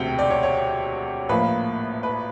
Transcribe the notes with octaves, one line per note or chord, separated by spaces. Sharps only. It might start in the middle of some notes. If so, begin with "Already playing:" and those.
Already playing: E1 D2 C3 G5
D5
C#5
C#5
A#1 A2 F3 A#3 B4
B4